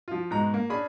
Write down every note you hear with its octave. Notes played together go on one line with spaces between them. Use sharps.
F3 F4
G#2 B2 G#3 A#5
A#3
C#4 D4 G#4 B5